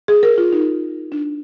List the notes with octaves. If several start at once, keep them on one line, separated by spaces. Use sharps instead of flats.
G#4
A#4
F4
D#4
D4